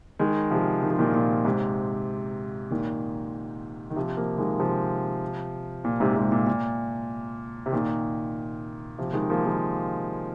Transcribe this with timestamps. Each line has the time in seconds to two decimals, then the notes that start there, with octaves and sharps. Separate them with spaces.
0.19 D#3 G#3
0.51 C3 F3
0.83 D#3
0.91 F3
0.99 A#2 D#3
1.14 A#2
1.45 G#2 C3
2.71 A#2 D#3
3.90 D#3
3.96 C3 F3
4.17 F3 A#3
4.38 D#3 G#3
4.59 C3 F3
5.84 A#2
6.00 G#2 C3
6.16 G#2 C3
6.32 A#2
6.47 A#2
7.66 C3
7.72 A#2 D#3
8.98 C3 F3
9.13 D#3 G#3
9.30 F3 A#3
9.45 D#3 G#3